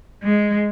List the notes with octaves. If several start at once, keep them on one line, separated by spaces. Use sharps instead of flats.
G#3